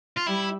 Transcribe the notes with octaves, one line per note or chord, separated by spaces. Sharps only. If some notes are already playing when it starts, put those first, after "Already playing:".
F4
G3 E4